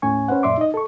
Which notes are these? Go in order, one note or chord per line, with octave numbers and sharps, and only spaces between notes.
D#2 A2 C#4 G#5 C#6
C#4 B4 C5 F#5
F#2 A#2 D5 E5 C6 D6
D#4 D#5
A4 C#6